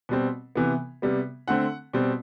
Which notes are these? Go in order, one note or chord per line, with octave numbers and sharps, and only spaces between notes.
B2 G3 C4
C3 E3 B3
C3 G3 B3
D3 A3 C4 F#5
B2 G3 C4